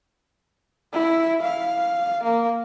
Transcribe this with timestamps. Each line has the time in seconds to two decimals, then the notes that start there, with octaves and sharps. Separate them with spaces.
0.93 E4
1.42 F5
2.23 A#3